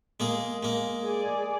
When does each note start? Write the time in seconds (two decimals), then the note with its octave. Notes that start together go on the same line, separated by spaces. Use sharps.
0.20 G#3 A#3 G#4
0.63 G#3 A#3
1.04 G#4 D5 G#5